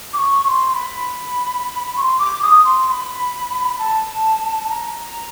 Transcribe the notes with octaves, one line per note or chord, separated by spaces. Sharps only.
D6
C#6
C#6
C6
B5
C#6
C6
D6
D#6
C6
C6
B5
A5
A#5